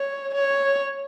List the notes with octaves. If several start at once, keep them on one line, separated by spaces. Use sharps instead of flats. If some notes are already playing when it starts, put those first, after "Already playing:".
Already playing: C#5
C#5